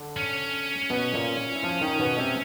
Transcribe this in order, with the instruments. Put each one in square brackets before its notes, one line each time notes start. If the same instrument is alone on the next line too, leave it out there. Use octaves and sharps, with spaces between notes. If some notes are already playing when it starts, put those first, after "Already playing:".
Already playing: [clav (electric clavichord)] D3
[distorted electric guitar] C#4
[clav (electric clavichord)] B2 B3
A#2 A#3
E4
F3 F4
D#3 D#4
B2 B3
C3 C4